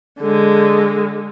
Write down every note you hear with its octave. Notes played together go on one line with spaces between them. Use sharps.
D3 G#3